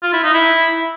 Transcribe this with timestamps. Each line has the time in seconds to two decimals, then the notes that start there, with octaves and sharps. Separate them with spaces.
0.03 F4
0.13 E4
0.23 D#4
0.34 E4